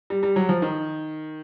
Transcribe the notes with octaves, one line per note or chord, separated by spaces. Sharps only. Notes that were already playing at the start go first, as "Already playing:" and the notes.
G3
G3
F#3
F3
D#3